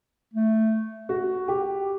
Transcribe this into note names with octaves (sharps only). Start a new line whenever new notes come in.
A3
F#4
G4